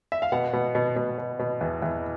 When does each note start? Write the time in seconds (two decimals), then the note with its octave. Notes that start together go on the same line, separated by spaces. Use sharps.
0.12 E5
0.22 F5
0.32 B2 F#5
0.53 B2
0.75 B2
0.96 B2
1.18 B2
1.39 B2
1.61 E2
1.82 E2